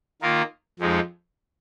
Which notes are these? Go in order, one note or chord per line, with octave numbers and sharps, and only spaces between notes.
D#3 A#3 F4 A#4
F2 F3 G#3 D#4